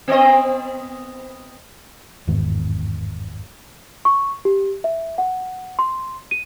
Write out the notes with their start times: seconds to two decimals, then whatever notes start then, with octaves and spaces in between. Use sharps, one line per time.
0.08 B3 C4 D#5
2.27 G1 E2 G#2 D#3
4.05 C#6
4.45 G4
4.84 E5
5.18 F#5
5.79 C6
6.31 D#7